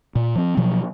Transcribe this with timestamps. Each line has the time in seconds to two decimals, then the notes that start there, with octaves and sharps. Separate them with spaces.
0.15 A#2
0.35 F3 C4
0.57 B2 F3 F#3